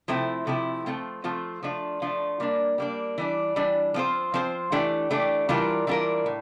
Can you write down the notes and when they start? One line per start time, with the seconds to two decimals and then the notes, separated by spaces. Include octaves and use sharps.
0.08 C3 F3 A3 C4 E4
0.47 C3 F3 A3 C4 E4
0.86 F3 A3 C4 F4
1.24 F3 A3 C4 F4
1.63 F3 A3 D4 F4
2.02 F3 A3 D4 F4
2.40 G3 A#3 D4
2.78 G3 A#3 D4
3.18 E3 G3 D4
3.56 E3 G3 D4
3.94 F3 C4 F4 C5
4.34 F3 C4 F4 C5
4.72 E3 A3 D4 G4
5.11 E3 A3 D4 G4
5.49 E3 G3 D4 F4 A#4
5.87 E3 G3 D4 F4 A#4
6.26 A2